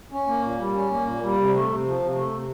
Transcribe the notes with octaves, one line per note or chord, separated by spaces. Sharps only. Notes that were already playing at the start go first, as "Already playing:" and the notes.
C#4
A#3
A#2
G3
C#4
A#3
A#2
G3
C3
A3
C3
F3
C3
A3
C3